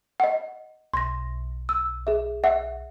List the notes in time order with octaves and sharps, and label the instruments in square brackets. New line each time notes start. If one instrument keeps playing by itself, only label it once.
[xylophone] D#5 F#5
[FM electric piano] B1 [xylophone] C6 A#6
[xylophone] E6
G#4 E5
E5 F#5